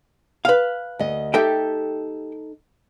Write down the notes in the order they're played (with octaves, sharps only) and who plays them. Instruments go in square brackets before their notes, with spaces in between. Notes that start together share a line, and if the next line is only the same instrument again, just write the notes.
[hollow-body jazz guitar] B4 F5
[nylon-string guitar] D2 D#5
[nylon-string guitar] D#4 A4 [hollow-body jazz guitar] G4 E5 G5